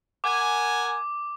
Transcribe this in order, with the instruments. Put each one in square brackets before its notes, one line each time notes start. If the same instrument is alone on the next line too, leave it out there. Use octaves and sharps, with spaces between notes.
[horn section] A#4 F#5 G#5 [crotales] D6